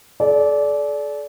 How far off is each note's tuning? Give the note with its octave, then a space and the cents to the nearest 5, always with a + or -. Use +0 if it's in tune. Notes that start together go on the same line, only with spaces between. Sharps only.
A4 -45 D5 -15